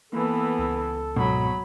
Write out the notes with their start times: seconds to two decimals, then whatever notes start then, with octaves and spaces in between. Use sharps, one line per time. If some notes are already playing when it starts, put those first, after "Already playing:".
0.13 E3 A#3 B3 A4
0.58 C#2
1.16 G#2 B2 F#3 B5